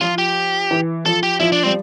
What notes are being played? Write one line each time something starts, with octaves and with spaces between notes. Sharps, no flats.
F3 F4
G4
E3
F3 A4
G4
F3 E4
D4
G3 C4